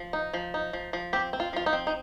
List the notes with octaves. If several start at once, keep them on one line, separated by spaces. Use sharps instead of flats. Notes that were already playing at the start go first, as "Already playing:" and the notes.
Already playing: F3
D#4
F3
D#4
F3
F3
C4 G4
C4
F4
F3 F4
D#4
C4
D#4